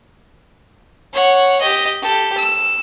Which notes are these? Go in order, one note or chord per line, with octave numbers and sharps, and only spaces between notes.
C#5 F#5
G4 D#5
G4 A4
E6